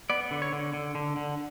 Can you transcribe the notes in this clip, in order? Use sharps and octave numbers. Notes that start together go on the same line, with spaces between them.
B3 D5
D3
C#5
D3
D3
D3
D3